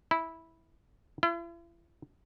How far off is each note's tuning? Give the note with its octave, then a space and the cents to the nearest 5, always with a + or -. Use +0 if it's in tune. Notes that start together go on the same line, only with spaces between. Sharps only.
E4 -10
E4 +45